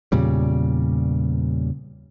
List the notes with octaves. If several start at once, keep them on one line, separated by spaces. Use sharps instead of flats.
E2 A#2 C#3 G3